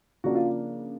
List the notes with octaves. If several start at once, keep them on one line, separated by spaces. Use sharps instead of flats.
C#3 F3 A#3 D4 F#4
F4